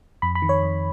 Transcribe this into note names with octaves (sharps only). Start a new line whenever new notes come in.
F2 B5
B5
D#3
C#5
F2